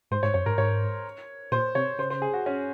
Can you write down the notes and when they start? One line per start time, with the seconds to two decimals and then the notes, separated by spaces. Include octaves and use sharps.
0.11 G#2 C5
0.23 G#2 C#5
0.34 F#2 C#5
0.46 G#2 A#4
0.58 G#2 C#5
1.51 A#2 C5
1.75 C3 C#5
1.98 C#3 C5
2.10 C5
2.22 G#4
2.34 F#4
2.46 C#4